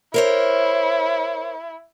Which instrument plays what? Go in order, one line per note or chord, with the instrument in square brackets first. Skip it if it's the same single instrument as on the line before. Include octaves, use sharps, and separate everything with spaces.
[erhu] E4 [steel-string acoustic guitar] A#4 C5 C#5